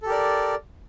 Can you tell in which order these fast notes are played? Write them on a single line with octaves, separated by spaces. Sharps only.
A4 G4 A#4 D5